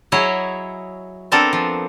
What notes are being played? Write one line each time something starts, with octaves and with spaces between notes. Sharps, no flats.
F#3 E4 G#4 C#5 D#5 F#5
B3 C4 D4 A4 A#4
F3